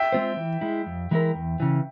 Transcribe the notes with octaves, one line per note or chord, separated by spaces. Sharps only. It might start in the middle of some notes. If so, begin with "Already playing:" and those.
Already playing: E5 G5
G#3 C4 F4 C5
E3
G#3 E4
F2
E3 G#3 E4 A#4
E2
C#3 E3